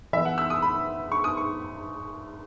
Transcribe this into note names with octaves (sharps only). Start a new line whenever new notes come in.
E3 B3 E5
F#5
E6
D#6
B5
C#6
D#6
C#6